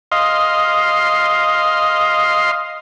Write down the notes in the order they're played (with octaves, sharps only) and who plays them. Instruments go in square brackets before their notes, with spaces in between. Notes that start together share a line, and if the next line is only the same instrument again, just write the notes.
[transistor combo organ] D#5 F5 C6